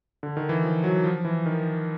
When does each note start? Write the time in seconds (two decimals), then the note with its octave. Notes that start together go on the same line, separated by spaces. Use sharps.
0.23 D3
0.37 D#3
0.49 E3
0.64 F3
0.84 F#3
1.04 F3
1.25 E3
1.46 D#3